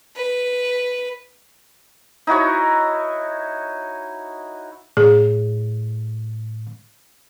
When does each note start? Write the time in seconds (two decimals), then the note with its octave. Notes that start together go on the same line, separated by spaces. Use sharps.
0.16 B4
2.27 D#4 E4 F#4 C#5
4.97 A2 G#4